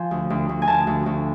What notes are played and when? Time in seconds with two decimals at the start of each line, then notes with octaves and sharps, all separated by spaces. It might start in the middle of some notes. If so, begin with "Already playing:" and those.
Already playing: F3 G#5
0.11 D2
0.30 D2
0.49 D2
0.62 G#5
0.68 D2 A5
0.87 D2
1.06 D2